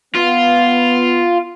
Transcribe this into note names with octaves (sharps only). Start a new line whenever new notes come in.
B3 F4